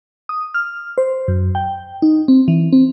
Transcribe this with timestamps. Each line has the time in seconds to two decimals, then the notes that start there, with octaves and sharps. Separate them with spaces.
0.29 D#6
0.54 F6
0.98 C5
1.28 F#2
1.55 G5
2.02 D#4
2.28 C4
2.48 E3
2.73 C4